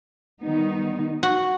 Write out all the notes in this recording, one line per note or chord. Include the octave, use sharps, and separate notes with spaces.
D#3 G3 B3 D#4
F#4